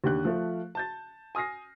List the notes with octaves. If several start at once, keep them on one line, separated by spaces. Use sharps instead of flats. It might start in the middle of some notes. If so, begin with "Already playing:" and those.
D#2 D3 G4 F#6
F3 A3
A5 G6 A6
G#5 D#6 F6 A#6 C7